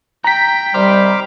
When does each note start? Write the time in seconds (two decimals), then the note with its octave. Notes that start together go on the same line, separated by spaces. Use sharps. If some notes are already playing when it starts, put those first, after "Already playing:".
0.24 G5 A#5 B6
0.74 C3 D#3 G3 C5 D6 F6